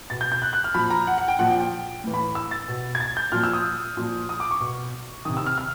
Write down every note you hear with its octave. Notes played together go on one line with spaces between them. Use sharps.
B2 A6
G6
G6
F#6
F#6
F6
A#2 F3 B5
A#5
F#5
F#5
G5
A#2 F3 F#5
G5
G5
A2 E3
B5
E6
A6
B2
G#6
A6
G6
A#2 F3 F6
E6
D#6
A#2 F3
D#6
D6
C#6
B2
C3 D#3 D#6
E6
F6
F6